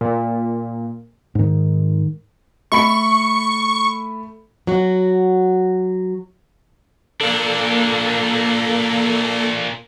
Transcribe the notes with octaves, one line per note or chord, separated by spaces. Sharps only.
A#2
G#2 D#3
A3 B5 C#6 C#7
F#3 F#4
A#2 A#3 D4 A4